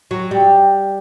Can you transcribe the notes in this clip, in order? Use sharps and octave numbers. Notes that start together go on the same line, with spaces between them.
F#3
G3